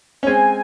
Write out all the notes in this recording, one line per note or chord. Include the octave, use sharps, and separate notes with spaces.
C#4
G#3 C4 G#5